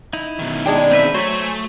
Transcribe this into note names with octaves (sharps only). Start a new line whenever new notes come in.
D#4 E4
B2 D#3
G#3 D4 G5
C4 B4 E5
F#3 A3 C5 G#5